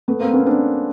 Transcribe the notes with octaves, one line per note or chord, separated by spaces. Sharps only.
A3 B3
A#3 C4
B3 C#4
C4 D4